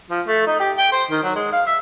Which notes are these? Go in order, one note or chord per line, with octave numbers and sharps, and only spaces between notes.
F3
A3
D#4
G4
G5
C5
D#3
F#3
G#3
F5
E5